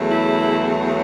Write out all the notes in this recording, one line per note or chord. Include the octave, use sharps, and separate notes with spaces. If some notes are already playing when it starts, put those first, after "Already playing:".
Already playing: E2 C#3 F#3 A3
E4